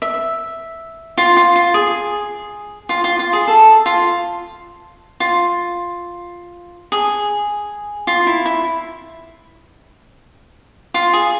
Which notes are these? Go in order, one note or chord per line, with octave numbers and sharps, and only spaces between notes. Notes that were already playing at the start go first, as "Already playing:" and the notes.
E5
F4
F4
F4
G#4
F4
F4
F4
G#4
A4
F4
F4
G#4
F4
E4
E4
F4
G#4